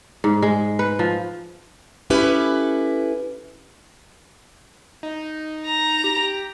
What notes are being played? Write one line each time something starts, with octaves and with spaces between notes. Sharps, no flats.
G#2
G#3
B4
F3
C#4 E4 G4 A4 B4
D#4
A#5
G4